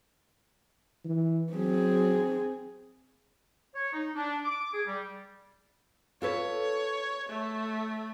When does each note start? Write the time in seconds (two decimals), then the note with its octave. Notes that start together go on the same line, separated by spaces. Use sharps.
1.05 E3
1.53 F#3 C4 G#4
3.75 C#5
3.93 D#4
4.16 D4
4.45 D6
4.74 G#4
4.87 G3
6.22 F4 A4 B4 C#5
7.29 A3